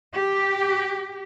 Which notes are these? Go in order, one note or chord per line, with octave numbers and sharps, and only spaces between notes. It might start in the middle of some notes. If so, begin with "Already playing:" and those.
G4